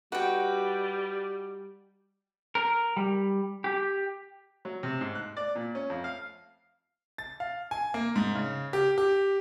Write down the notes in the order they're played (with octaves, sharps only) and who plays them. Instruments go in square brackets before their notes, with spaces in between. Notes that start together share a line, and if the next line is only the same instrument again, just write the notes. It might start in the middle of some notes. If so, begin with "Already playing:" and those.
[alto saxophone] G3 [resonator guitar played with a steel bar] D#4 F#4 [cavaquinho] B4 G5
[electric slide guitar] A#4
G3
G4
[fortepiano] F#3
C3
G#2
F#6
D5
A#2
C#4
F2
F5
[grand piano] A6
F5
G#5
A#3
G#2
C#3
G4
G4